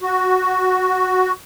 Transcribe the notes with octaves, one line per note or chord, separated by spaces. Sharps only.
F#4